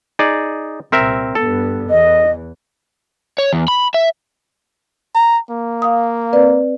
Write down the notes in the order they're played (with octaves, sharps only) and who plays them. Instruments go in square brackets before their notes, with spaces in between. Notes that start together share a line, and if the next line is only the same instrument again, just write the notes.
[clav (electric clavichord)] D#4 G#4 D5
[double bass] C2 A#2 [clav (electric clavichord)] C4 A#4 E5
[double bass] G2 B3 [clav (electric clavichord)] A4
[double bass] E2 E3 [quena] D#5
[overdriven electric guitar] C#5
E2
B5
E5
[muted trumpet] A#5
A#3
[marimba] F5 D#6
C4 B4 D5